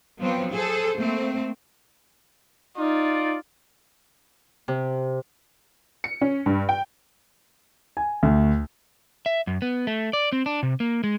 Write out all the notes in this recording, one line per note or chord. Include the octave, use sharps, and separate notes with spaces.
F3 F#3 B3 C4
G#4 A4 C5
A3 A#3 C4
D#4 F4 D5
C3
C#7
C#4
G2
G5
G#5
D2
E5
F#2
B3
A3
D5
C4
D4
C3
A#3
G#3